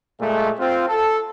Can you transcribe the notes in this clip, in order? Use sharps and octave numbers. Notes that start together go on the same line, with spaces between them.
A#2 G#3 A3
C4 F4
A4